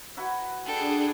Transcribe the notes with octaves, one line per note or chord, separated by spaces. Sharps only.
E4 F#4 B4
D4 G#4 A4 G5